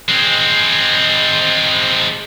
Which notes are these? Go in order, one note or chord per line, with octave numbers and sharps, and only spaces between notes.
G#3 C4